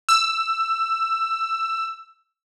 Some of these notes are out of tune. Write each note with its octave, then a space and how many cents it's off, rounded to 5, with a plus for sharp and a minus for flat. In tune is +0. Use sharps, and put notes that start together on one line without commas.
E6 +15